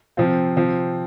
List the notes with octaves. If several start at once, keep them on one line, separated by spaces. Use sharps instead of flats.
C3 F3 C4 F4
C3 F3 C4